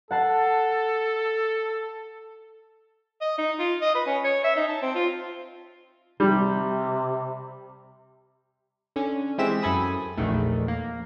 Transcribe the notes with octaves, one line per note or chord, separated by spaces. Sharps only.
A4 F#5 A5 C7
D#5
D#4
F4
D#5
B4
C#4
C#5
E5
D#4
A5
C4
F4
C3 G3
D3 C#4
E3 G#3 C4 G4 E5 E7
F#2 E4 A4 G#5 B5 D#6
A#1 E2 D#3 A3
A#3